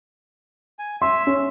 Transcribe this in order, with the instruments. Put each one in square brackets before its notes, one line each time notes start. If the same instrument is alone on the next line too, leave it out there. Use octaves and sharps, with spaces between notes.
[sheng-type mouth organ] G#5
[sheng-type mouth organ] E5 [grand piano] C6
[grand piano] C#4